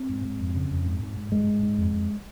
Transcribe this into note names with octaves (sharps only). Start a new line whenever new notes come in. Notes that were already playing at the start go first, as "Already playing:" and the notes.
Already playing: C4
G#2
G#2
F2
C#3
F2
G#2
G#2
G#2
G#2 G#3
G#2
G#2
F2
F2